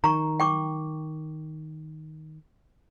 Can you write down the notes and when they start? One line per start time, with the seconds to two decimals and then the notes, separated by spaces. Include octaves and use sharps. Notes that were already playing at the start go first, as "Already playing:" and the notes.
0.04 D#3 A#5 C#6
0.40 G5 C#6 D6